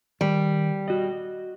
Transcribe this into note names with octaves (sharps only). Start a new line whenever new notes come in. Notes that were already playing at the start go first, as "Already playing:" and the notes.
D#3 G3
F#4 D#5